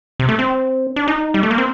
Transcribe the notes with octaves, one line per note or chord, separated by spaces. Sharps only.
C3
A3
C4
D4
D#4
G3
A3
A#3
C4